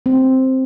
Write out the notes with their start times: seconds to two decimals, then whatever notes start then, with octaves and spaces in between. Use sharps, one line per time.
0.06 C4